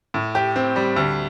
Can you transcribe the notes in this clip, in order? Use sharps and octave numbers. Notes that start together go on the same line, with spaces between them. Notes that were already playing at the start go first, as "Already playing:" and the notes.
A2
G4
C4
G3
D2